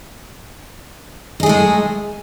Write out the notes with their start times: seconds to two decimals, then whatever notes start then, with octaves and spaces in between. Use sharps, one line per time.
1.40 D#4
1.43 G#4
1.46 A3
1.49 G#3